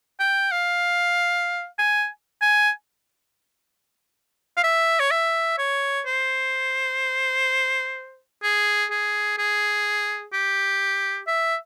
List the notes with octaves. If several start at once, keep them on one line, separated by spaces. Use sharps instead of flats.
G5
F5
G#5
G#5
F5
E5
C#5
E5
C#5
C5
G#4
G#4
G#4
G4
E5